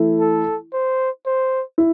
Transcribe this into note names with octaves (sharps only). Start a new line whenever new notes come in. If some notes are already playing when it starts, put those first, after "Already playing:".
Already playing: E3 A3 E4
A4
C5
C5
E4